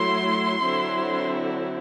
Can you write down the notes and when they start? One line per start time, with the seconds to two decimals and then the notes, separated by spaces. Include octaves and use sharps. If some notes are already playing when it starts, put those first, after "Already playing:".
Already playing: F#3 A3 E4 C6
0.63 D3 F#3 C4 E4